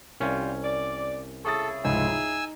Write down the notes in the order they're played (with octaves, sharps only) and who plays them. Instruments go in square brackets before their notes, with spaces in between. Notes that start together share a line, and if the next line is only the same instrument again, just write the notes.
[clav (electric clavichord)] C2 C#4 [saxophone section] G3 F4
[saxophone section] D5
[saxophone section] C#3 E4 G#4 [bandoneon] A4 [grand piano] C#6 D#6 A6
[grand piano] F1 C#2 G#2 [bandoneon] G#5 E6
[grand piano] D#4